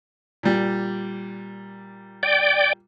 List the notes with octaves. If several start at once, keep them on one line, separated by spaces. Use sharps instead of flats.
A#2 G3
D5 G5